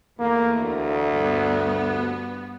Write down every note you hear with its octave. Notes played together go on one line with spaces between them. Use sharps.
E2 A3 A#3
D2
G2 B3